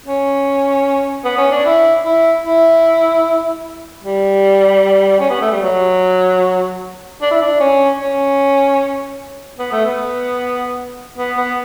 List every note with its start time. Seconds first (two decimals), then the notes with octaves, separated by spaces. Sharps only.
0.06 C#4
1.25 B3
1.38 C#4
1.51 D4
1.66 E4
2.05 E4
2.45 E4
4.04 G3
5.19 C#4
5.30 B3
5.41 A3
5.52 G3
5.62 F#3
7.22 D4
7.31 E4
7.42 D4
7.60 C#4
8.01 C#4
9.59 B3
9.72 A3
9.85 B3
11.18 B3
11.37 B3